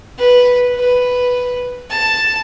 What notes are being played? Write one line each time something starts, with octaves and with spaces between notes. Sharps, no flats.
B4
B4
A5